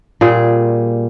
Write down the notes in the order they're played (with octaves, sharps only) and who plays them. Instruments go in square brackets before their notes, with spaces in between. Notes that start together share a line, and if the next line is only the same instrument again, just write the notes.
[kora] A#2 G3 G#4